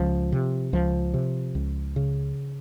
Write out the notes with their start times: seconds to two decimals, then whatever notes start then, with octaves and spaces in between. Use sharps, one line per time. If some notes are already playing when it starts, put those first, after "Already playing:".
Already playing: C#2 F3
0.32 C3
0.73 C#2 F3
1.14 C3
1.55 C#2
1.96 C#3